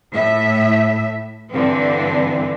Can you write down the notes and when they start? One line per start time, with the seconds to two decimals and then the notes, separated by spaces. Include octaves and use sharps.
0.12 A2 E5
1.52 G2 D3 E3 C4